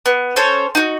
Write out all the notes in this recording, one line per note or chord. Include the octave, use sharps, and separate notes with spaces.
B3
C#4 A4 C5 C#5
D#4 F#4